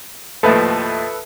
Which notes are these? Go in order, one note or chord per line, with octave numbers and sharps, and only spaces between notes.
D#2 A2 F3 A4 B4 E5